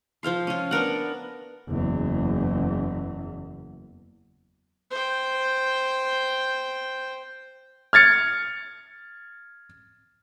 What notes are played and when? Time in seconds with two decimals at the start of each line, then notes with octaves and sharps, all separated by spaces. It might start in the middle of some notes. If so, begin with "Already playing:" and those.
0.23 F3 C5 F5 C6
0.47 C#4 F4
0.71 B3 D4 A#4 F#5
1.68 F#1 E2
4.91 C5 G5
7.93 F6 G#6 A6 C#7